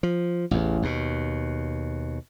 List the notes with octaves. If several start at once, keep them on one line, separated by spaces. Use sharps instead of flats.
F3
A1 E2
D#2 B2